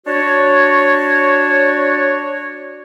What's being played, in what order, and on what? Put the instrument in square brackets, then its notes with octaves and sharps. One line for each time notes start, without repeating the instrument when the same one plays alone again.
[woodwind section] D4 F#4 C#5